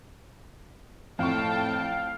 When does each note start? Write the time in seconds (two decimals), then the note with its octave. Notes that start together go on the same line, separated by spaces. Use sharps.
1.19 F2 A2 F5 G5 A5 C#6